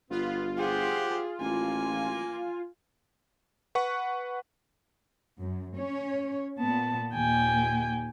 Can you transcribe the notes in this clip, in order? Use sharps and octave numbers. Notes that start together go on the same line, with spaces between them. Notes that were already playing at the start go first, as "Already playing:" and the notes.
G1 B3 F4
G4 G#4 C5 F#5
A1 A#3 G#5
B4 F#5 C#6
F#2
C#4 C#5
A#2 B3 A5
D#2 A#2 G5 G#5